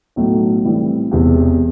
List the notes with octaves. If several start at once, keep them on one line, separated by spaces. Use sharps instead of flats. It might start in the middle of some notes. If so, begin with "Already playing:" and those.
B1 A2 F#3 A3
A2 E3 G3 C4
E1 E2 C3